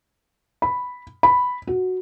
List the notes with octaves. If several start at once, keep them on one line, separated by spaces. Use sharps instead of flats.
B5
B5
F#4